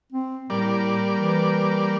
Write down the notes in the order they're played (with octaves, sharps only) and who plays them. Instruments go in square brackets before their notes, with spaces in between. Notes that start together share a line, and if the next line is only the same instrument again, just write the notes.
[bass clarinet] C4
[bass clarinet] A2 [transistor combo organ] G3 A#3 D5
[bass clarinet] E3